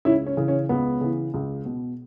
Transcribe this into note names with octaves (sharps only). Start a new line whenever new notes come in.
C#2 C#4 E4
C#4
C#3 E3
C#4
C#2 B3
C#3 E3
C#2
B2